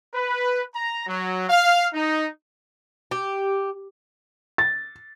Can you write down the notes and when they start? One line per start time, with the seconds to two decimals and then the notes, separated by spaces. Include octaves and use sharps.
0.13 B4
0.74 A#5
1.07 F#3
1.49 F5
1.94 D#4
3.11 G4
4.58 A6